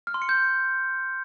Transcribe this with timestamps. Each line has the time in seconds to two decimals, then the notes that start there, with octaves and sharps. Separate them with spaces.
0.07 F6
0.14 C6
0.22 C#7
0.29 G6